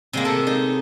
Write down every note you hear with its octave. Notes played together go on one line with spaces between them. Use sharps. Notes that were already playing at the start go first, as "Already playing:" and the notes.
C3 G#3 A#3
A4
D#4